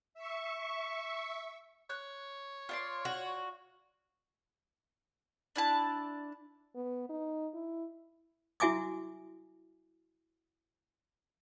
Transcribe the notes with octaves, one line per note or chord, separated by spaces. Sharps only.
E5 C#6
C#5 F#6
F4 D5 C6
F#4
D4 E4 A5
B3
D#4
E4
E4 F#4 E5 G#5 D6 D#6